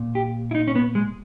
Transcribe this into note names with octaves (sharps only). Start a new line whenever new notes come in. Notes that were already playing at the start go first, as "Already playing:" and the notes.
Already playing: A#2
G4
E4
D#4
C#4
B3
G#3